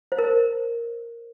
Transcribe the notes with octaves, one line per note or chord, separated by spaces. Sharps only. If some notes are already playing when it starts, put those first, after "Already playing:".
C5
A#4